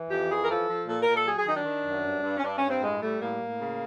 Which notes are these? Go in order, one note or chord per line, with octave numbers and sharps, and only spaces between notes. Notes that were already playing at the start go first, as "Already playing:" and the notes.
Already playing: E3
F2 G4
E3 G#4
A#4
F3 A4
F3
A#2 A4
A#4
A#2
A4
F#3 G#4
G#4
D#3 D#4
D4
D#3
F#2
G2
G2
C#4
G2 D4
C#4
G2
C4
A2 G#3
G3 A3
A2 A#3
A2
C#3